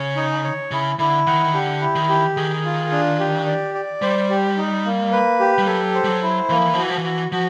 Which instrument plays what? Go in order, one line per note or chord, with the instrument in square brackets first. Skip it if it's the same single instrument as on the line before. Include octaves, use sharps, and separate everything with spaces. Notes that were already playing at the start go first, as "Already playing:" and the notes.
Already playing: [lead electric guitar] C#3 [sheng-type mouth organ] C#5
[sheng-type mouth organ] D#4
C#5
[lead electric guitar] C#3 [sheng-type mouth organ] E4
[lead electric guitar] D3 [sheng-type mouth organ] E4
[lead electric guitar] D#3 [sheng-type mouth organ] F#5
[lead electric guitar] D#3
[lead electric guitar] D3 [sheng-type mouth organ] G4
[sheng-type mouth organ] E4
[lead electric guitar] D#3
[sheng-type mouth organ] G4
[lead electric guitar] D#3 [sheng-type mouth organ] G#4
[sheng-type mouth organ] F4
D4
G4
D5
D5
[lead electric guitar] G3 [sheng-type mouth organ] C5
[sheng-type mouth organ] G4
D#4
A#3
B4
G4
[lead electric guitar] G3
[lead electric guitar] F#3 [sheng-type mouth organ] A4
[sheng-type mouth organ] C5
[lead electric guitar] G3
F#3
[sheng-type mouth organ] E4
[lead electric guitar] E3 [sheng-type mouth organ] A#3
[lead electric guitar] F3
E3
[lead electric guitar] F3 [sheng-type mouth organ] F#4
[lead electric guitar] E3
F3
E3
[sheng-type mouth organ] F#4
[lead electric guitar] F3 [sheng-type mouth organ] F#4